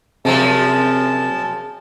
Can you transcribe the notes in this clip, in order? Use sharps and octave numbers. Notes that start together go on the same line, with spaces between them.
F#2 C3 F3 G#3 A5